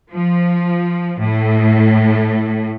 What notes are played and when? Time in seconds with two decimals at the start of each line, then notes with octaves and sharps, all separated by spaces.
0.12 F3
1.20 A2